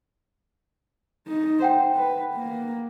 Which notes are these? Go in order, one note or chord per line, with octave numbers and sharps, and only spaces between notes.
D#4
C5 F#5 G5
B4
A#3